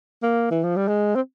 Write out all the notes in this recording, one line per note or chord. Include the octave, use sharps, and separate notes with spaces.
A#3
E3
F3
G3
G#3
C4